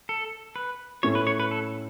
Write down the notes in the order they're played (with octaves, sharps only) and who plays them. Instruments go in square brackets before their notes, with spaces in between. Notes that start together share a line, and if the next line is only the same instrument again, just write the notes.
[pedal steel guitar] A4
B4
[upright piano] A2 A3 C#4 E4 [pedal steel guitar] C#5
[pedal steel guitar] B4
C#5
B4
A4